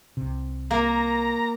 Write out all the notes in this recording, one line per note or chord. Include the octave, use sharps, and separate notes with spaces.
C2 C3
A#3 A#5